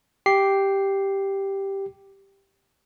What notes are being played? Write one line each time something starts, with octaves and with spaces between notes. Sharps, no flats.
G4 C7